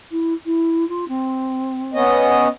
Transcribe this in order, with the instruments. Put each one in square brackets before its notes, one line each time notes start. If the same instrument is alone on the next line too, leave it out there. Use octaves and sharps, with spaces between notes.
[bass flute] E4
E4
F4
C4
[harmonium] B3 C#4 D#5